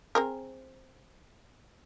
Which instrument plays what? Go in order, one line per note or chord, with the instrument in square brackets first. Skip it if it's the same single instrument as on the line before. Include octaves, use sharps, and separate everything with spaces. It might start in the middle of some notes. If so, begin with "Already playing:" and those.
[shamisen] C4 G#4 A#4